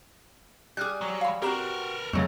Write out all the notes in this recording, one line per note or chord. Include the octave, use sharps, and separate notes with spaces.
G3 G#4 D6 F6 F#6
F#3
F5 B5
C4 F#4 G4 A#4 B4 A#5 E7
F2 C#3 F#3 G#3 A3 B3